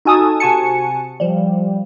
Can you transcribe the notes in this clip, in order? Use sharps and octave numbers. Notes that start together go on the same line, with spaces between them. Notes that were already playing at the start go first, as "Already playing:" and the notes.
D#4 F#4 A4 G#5 A5 D#6
C3 F#4 G#5 A5 C#7
F3 G3